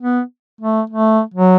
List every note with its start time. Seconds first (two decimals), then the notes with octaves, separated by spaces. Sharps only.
0.01 B3
0.61 A3
0.90 A3
1.34 F#3